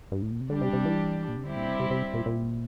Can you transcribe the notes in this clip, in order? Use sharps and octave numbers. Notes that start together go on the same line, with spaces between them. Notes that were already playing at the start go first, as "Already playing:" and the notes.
G2
A2
A#2
C3
D3 G3 D4 G4
C3
C3
E3
A#2
C3
D3 G3 C4 E4 G4
A#2
C3
C3
C3
A#2
A#2